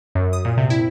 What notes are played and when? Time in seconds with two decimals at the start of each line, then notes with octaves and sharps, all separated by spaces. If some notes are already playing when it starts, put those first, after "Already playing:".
0.15 F#2
0.33 D#6
0.45 A#2
0.58 C3
0.70 E4